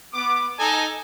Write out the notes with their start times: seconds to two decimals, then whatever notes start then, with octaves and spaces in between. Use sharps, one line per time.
0.13 B3 D6
0.59 D#4 A4 D#5 G#5 A#5